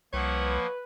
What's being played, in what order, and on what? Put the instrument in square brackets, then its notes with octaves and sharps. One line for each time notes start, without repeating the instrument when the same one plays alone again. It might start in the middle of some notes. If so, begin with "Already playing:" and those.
[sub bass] C2 [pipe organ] F3 A#3 [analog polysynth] B4 [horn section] C#5 E5 F#5